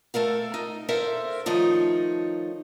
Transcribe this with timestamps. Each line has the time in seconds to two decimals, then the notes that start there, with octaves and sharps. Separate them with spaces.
0.14 A3 A4 A#4 F5
0.54 D#4
0.89 A4 A#4 C5 E5 F5
1.46 D#3 F3 A3 D#4 C#5